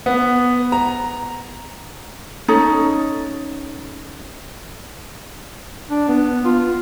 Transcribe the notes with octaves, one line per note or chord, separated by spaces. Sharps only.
B3
A#5
C#4 D#4 A4
D4
B3
F4